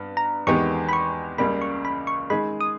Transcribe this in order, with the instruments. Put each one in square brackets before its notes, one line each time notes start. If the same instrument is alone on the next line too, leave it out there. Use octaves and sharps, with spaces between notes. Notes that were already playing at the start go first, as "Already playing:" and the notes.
Already playing: [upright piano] G2 B3
[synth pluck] A#5
[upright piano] E2 D#3 G#3 B3 G4 [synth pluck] C#6
[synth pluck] B5
C#6
[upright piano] C#2 C#3 G3 A#3 [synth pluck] B5
[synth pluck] C#6
B5
C#6
[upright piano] D#3 G#3 D#4 G#4 [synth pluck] B5
[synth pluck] D#6